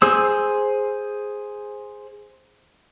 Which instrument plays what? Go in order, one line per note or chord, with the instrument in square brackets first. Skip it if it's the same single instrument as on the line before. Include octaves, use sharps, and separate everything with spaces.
[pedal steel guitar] G#4 C5 E6